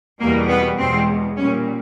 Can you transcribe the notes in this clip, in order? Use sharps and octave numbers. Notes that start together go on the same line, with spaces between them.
E2 B2 G3 A#3
B3
E2 B2 G#3 C4
A#2 G3 C#4